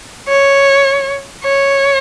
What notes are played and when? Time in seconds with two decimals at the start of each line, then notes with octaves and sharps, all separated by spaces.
0.28 C#5
1.44 C#5